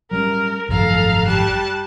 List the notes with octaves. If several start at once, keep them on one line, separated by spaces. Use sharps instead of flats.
F#3 G3 C#4 A#4
G#1 F#2 F3 A4 F5 A#5
G3 A5 F#6